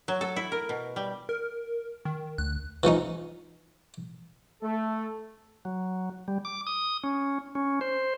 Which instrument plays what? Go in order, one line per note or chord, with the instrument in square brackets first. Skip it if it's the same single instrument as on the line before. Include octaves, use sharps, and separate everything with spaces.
[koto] F#3
A4
E4
A#4
B2
G3
[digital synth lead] A#4
D#3
[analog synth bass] D2 [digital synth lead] F#6
[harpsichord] E3 F3 C#4 D#4
[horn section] A3 [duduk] A4
[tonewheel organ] F#3
G3
D6
D#6
C#4
C#4
C5